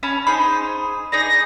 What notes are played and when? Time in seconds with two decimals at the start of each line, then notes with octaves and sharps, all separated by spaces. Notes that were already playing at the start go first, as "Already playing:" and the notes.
0.03 C#4 A5 B5
0.27 D#4 G#4 C5 B5
1.12 D#4 G#4 D5 A#6